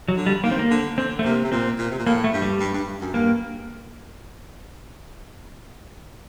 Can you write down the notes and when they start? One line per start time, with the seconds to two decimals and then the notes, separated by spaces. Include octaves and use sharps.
0.08 F#3
0.17 D3
0.26 G3
0.43 D#3 A#3
0.51 C4
0.59 A#3
0.71 D3
0.98 D3 C4
1.19 A3
1.25 C3 A#3
1.45 C3
1.52 A#2 C4
1.79 A#2
1.91 C3
1.99 A#2
2.06 A2 A#3
2.24 A3
2.33 G2
2.42 G3
2.60 G2
2.74 G2
3.01 F#2
3.14 G2 A#3